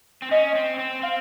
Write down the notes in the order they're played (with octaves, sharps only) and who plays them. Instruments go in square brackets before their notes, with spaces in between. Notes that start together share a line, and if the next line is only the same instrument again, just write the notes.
[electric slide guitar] C4
[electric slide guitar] C#4 [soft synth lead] D#5
[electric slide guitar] C4
C4
[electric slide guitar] C4 [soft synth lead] F5